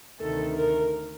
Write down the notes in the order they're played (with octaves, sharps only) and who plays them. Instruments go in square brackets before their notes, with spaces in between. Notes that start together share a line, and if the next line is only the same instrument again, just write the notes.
[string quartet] D2 C3 D#3 A3 A4
A#4